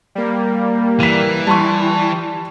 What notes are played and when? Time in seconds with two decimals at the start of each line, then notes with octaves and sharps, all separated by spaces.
0.15 G3 A#3
1.00 E3 B6 D#7
1.47 G3 A5 C6 C#6